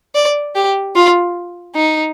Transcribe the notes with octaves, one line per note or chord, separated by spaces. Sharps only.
D5
G4
F4
D#4